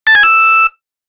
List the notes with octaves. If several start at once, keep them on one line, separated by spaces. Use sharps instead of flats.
A5
G#5
E6